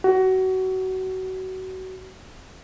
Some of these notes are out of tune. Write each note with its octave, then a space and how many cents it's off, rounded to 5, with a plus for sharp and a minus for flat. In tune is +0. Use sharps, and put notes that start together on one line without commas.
F#4 +25